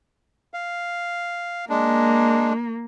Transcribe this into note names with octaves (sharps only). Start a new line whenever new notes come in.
F5
G#3 A#3 D4